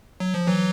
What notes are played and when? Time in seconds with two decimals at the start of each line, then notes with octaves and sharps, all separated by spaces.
0.20 F#3
0.34 F3
0.47 E3 F#3